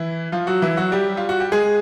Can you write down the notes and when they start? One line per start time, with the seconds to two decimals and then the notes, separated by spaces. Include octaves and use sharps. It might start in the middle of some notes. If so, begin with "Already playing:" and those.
Already playing: E3 E4
0.32 F3 F4
0.47 F#3 F#4
0.62 E3 E4
0.77 F#3 F#4
0.92 G3 G4
1.17 F4
1.29 F#4
1.40 G4
1.52 G#3 G#4